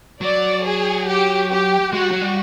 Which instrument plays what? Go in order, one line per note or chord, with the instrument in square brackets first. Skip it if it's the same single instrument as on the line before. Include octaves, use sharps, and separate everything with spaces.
[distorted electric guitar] F#3 [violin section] D5
[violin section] G#4
G4
G4
[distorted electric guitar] G#3 [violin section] F#4
[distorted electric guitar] G3
F#3
G3